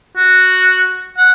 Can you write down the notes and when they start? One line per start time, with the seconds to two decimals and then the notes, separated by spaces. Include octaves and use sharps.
0.17 F#4
1.18 F#5